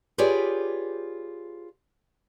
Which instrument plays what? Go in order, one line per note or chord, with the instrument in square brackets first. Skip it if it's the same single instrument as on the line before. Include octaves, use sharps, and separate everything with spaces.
[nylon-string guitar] F4 G4 G#4 B4 C#5 D5